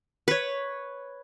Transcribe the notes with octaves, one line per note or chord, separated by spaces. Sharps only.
B4 C#5